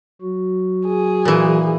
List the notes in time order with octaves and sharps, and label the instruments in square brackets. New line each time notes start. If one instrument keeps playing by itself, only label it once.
[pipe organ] F#3 F#4
[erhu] G#4
[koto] A#2 E3